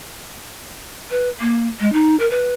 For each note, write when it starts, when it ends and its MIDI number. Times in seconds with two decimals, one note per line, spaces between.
1.10 1.29 71
1.40 1.67 58
1.79 1.92 56
1.92 2.15 63
2.19 2.29 70
2.30 2.54 71